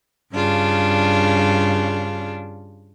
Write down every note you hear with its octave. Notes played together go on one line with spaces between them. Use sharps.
G2 C#3 D4 F4